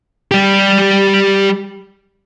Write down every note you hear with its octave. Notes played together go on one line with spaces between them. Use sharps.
G3 G4